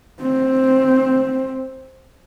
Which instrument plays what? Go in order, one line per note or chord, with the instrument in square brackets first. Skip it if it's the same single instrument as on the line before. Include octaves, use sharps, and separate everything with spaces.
[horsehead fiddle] C4